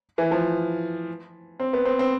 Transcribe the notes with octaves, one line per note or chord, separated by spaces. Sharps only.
E3
F3
C4
B3
C4
C4